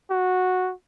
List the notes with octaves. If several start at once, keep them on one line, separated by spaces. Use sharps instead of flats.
F#4